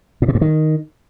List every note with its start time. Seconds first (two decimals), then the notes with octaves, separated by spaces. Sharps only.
0.22 A2
0.28 A#2
0.35 G2
0.41 D#3